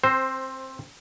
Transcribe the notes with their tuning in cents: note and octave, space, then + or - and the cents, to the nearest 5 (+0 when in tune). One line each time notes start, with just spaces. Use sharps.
C4 +15 C5 +0